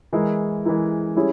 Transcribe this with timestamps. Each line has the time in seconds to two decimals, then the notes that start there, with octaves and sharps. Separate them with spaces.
0.13 E3 G#3 E4 A#4
0.65 E3 G#3 E4 A#4
1.16 G3 C#4 E4 G#4